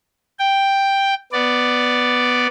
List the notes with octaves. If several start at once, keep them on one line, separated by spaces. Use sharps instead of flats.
G5
B3 D5